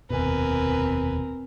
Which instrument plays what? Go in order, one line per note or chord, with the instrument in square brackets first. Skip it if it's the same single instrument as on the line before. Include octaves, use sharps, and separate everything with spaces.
[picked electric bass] F1 D#2 B2 [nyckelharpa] C4 A#4 [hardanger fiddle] B4 G#5